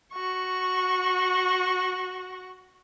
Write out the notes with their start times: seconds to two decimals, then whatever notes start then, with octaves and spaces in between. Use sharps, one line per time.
0.13 F#4 C#6